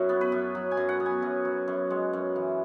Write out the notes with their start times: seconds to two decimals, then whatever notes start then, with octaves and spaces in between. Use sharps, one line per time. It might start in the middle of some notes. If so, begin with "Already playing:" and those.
Already playing: F#2 F#3 E4 F#4
0.09 B3
0.21 B4
0.32 F#2
0.55 F#3
0.71 G#5
0.77 F#2
0.89 F#5
1.00 B3
1.06 G#5
1.22 F#2
1.45 F#3
1.68 F#2
1.90 G#3 F#5
2.13 F#2
2.36 E3